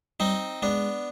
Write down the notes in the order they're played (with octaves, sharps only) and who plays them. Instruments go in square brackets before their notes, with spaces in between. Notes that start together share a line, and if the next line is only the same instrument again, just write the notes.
[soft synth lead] G3 [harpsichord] C4 D#4
[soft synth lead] G#3 [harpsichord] B3 D4